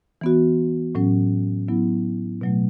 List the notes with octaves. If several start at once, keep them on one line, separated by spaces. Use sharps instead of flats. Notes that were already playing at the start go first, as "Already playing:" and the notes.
E3 B3 F#4
A2 F#3 C#4
F#3 B3 E4
B2 F#3 A3